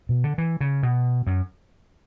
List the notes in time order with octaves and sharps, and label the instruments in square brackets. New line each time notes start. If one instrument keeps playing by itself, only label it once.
[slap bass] B2
D3
E3
C#3
B2
F#2